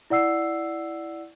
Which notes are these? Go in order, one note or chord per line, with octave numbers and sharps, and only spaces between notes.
E4 D5 F#5 E6 C7